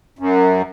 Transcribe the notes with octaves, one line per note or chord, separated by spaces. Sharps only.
F#2